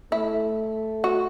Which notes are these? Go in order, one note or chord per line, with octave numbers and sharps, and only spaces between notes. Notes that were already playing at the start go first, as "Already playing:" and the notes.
A3 E4
F#4